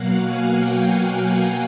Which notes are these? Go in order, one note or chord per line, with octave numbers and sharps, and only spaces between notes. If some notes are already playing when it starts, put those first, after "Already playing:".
Already playing: B2 F#3 A#3 F5 F#5
G#5
G5
F#5
G5